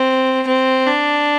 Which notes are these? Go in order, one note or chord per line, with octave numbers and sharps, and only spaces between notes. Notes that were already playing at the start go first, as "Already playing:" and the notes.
Already playing: C4
C4
D4